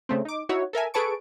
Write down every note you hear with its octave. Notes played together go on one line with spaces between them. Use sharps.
C#3 A3 C4
D#4 D6
D#4 E4 F#4 C#5
A4 A#4 E5 G#5
G#4 A4 B4 A5 C#6 D7